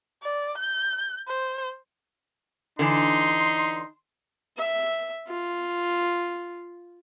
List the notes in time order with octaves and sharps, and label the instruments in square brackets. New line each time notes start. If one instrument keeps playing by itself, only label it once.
[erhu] D5
G6
C5
[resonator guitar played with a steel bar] D3 E3 [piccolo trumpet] D#4 [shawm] C6
[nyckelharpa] E5
F4